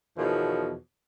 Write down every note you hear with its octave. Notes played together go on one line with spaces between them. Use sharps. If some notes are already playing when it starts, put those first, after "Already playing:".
E2 B2 D#3 F3 C#5